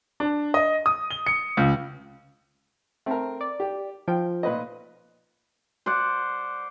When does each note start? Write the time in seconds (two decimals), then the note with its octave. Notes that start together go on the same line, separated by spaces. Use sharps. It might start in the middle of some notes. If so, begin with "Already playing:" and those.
0.20 D4
0.54 D#5
0.86 D#6
1.11 G7
1.27 C#7
1.57 C#2
3.06 A3 C4 A#4
3.41 D5
3.60 G4
4.08 F3 G5
4.43 A#2 B4 D#5
5.86 C5 D5 F#5